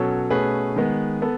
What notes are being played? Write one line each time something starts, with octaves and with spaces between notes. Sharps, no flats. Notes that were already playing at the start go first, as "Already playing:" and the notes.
Already playing: B2 F#3 C#4 A4 C#5
B2 A3 C#4 G#4 B4
D#3 G#3 B3
B3 A4